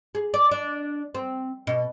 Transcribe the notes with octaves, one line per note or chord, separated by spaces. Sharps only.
G#4
D5
D4
C4
B2